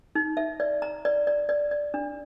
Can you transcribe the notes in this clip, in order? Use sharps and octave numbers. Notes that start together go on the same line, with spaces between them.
D#4
E5
D5
A#5
D5
D5
D5
D5
D4